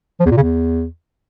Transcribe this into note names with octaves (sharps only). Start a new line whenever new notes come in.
F3
E2
A#2
C#3
E2